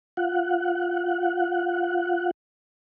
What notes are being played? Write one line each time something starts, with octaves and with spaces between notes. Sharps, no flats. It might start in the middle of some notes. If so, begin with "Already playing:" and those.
F4 F#5